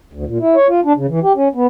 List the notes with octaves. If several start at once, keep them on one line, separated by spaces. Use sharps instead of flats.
D2
A#2
E4
C#5
F4
D4
C#3
E3
G4
C#4
B3